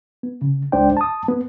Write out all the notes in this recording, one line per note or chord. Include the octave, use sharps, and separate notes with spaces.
B3
C#3
C#2 G#3 D4 C5 D5 G5
A5 D#6
B3